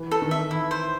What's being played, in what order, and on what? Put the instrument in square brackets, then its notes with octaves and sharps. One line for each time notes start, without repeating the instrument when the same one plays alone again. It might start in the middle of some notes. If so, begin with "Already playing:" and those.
Already playing: [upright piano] E3
[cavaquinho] A4
[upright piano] D#3
[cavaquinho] E5
[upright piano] E3 [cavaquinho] E4
[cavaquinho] C5